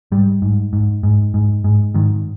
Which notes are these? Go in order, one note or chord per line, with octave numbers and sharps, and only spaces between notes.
G#2 G3
G#2
G#2
G#2
G#2
G#2
G#2 D#3